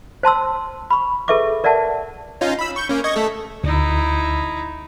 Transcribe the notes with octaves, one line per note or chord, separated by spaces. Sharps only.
C5 A5 C6 E6
B5 C#6
G#4 A4 B4 E5 C#6 D6
A#4 D5 E5 F#5 A5
C#4 D#4 F4
B5 E6
C#6 G6
A#3 C#4
D#5 C#6 G#6
A3 A4
D2 D#4 E4